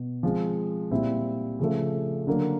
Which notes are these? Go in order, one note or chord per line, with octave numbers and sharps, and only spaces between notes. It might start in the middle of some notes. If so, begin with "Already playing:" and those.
Already playing: B2
F3 G#3 C4
A#2 G3 C4 E4
C#3 F3 A3
D3 F#3 A#3